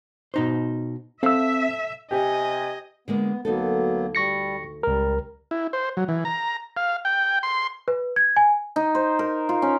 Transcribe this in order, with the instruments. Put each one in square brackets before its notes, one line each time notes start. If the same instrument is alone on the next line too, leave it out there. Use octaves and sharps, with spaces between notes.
[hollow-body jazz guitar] B2 D#4 C5
[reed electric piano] C4 E6 [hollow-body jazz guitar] A4 F5 [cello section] E5
[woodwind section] C3 G#5 [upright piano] G4 [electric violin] D#5
[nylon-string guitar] D3 G#3 A#3 [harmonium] B3
[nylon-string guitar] D2 D#4 A4 [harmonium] F#3 A#3 B3
[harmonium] G3 [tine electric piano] C#6 A#6 C#7
[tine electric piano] C#2 A#4 [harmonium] G3
[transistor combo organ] E4
C5
F#3
E3
A#5
F5
G5
C6
[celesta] B4
G#6
G#5
[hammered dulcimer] D#4
C5
A#4
F4
C#4